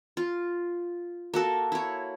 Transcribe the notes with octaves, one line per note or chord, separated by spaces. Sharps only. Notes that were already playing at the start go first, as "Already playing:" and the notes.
F4
A#3 F#4 A4
E4 C#5